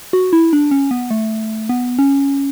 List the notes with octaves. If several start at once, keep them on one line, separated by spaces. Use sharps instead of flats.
F#4
E4
D4
C#4
B3
A3
B3
C#4